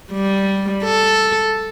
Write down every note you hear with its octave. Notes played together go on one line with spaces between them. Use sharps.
G3
A4